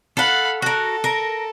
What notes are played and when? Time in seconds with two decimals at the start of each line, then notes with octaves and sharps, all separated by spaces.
0.17 A4 F5 F#5 B5
0.62 F#4 A4 A#4
1.04 A#4